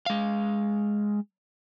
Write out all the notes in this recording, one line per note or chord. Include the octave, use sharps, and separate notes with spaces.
G#3 F5